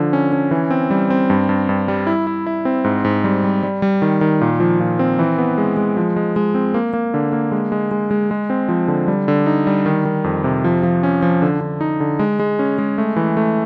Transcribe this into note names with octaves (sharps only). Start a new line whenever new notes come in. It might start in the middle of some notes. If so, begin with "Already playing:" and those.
Already playing: D3 F3
C#4
C#4
E3
C4
G3
C4
G2
G2
G2
G3
E4
E4
E4
C4
G#2
G#2
G3
G3
G3
G3
D#3
D#3
A#2
F3
A#2
C4
E3
B3
G#3
G#3
F3
G#3
G#3
C4
A#3
A#3
D3
A#3
G#3
G#3
G#3
G#3
G#3
C4
F3
D3
G3
D3
D#4
G3
D#3
D#3
F2
C3
F3
F3
C#4
F3
D3
D3
D#4
D3
G#3
G#3
C#4
G#3
A3
E3
A3